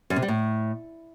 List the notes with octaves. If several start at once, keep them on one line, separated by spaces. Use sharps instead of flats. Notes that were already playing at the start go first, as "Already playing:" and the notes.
F#2
C3
G3
A2